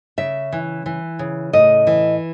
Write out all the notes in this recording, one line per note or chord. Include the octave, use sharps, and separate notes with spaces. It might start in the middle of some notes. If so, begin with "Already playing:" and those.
C#3 E5
E3
E3
C#3
A2 D#5
E3